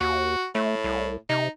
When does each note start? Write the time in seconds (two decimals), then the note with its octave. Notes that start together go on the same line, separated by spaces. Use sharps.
0.01 D#2 F#4
0.55 A2 A3
0.84 C2
1.29 C3 D#4